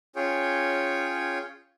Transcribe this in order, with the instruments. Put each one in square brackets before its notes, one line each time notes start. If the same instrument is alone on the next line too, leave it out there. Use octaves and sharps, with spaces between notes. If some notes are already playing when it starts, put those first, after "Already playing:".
[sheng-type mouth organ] C#4 F4 G#4 C#5 G5